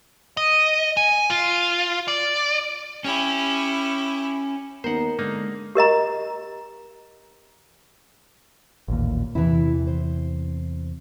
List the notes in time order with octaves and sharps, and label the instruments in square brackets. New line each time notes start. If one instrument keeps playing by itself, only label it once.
[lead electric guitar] D#5
G#5
F4
D5
[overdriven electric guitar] C#4 [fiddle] E4 G4
[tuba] D#2 [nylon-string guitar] B3 D#4 [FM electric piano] A#4 A#5 [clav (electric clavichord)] C5 F#5
[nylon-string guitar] D3 [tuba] G#3 [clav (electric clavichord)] A#3 D#4
[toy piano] G4 A#4 D#5 A#5
[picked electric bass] A1 D#2 A#2
[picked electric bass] E2 C3 [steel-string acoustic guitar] E3 E4
[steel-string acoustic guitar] C5